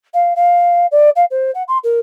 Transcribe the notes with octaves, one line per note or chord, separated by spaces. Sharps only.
F5
F5
D5
F5
C5
F#5
C6
A#4